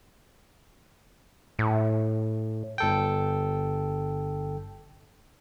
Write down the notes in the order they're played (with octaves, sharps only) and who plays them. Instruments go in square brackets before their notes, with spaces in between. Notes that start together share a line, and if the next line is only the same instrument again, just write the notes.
[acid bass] A2
[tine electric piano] G1 A4 G5